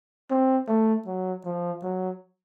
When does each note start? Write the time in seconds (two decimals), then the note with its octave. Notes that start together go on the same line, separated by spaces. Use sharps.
0.31 C4
0.68 A3
1.06 F#3
1.45 F3
1.83 F#3